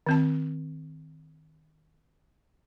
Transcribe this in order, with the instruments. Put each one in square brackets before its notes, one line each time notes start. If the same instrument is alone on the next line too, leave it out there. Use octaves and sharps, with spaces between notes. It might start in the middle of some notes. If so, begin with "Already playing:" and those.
[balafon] D#3 C4 A5